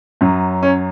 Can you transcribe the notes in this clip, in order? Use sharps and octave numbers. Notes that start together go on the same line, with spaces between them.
F#2 F#3
C#4